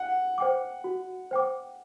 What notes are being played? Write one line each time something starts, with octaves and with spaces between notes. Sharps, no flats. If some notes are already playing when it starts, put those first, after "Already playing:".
Already playing: F#5
C5 G5 D6
F#4
C5 G5 D6